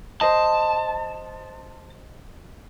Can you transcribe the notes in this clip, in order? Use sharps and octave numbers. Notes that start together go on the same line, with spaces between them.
C5 D#5 A5